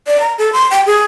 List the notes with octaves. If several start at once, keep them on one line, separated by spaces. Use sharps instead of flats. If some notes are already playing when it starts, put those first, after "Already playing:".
D5
A#5
A4
C6
G5
G#4